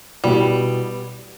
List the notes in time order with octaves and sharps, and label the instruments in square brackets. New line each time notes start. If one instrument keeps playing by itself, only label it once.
[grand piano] B2 B3 E4 G4 [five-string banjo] G3